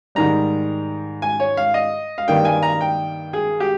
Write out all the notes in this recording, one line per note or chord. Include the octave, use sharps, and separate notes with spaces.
G#2 D#3 G3 A#5
G#5
C#5
F5
D#5
F5
G2 D#3 G3 A#3 G5
G#5
A#5
G5
G#4
G4